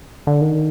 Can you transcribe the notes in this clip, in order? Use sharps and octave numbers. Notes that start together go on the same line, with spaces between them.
D3
D#3